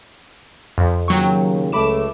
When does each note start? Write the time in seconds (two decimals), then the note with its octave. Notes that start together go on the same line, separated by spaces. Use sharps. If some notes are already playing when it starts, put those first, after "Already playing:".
0.78 F2
1.08 D#2 C#3 F#3 G5 C#6
1.72 C#2 A3 B5 D6 E7